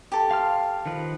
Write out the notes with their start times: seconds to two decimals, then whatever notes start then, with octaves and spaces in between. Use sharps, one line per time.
0.12 G4 A4
0.31 F5 C6 F6
0.86 D#3 F3 B4